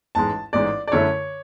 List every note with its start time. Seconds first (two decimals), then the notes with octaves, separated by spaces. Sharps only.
0.15 A1 G#2 G#3 A5
0.53 A1 G#2 G#3 D5
0.87 D5
0.92 F#2 D3 A3 E4 C#5